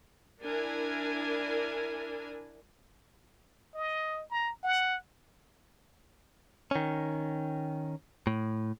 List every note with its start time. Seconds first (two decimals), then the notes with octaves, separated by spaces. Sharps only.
0.41 D4 E4 A#4 G#5
3.75 D#5
4.31 A#5
4.63 F#5
6.71 D#3 C#4
8.27 A2